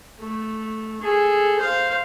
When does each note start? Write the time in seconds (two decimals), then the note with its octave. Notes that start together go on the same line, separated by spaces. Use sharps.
0.20 A3
1.02 G#4 A4
1.58 C5 F5